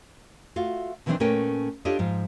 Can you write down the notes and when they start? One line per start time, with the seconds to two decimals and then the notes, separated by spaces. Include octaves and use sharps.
0.56 A3 F4 F#4
1.06 B2 D#3 E3 F#3 C4 D4
1.20 A#2 A3 C#4 A#4 B4 G5
1.85 D4 F4 G4 A4 C#5 D#5
1.99 G#2 F3 F4